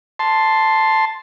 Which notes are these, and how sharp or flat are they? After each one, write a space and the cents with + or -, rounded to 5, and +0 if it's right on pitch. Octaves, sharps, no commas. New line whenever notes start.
A5 +0 C6 +0